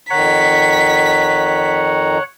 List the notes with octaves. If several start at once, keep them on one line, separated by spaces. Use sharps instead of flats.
F2 D#3 C#5 F#5 A#5 B6